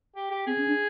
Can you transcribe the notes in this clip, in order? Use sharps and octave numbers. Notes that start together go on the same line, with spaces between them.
G4
G4
C4 G#4
C#4
D4